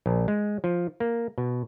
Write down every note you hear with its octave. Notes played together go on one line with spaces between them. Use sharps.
A#1
G#3
F3
A#3
B2